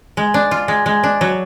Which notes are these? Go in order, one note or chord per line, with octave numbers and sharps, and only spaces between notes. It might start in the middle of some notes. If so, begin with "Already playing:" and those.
G#3
D4
F4
G#3
G#3
D4
F#3